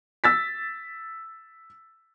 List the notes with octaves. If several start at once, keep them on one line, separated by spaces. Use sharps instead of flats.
E6 A6 B6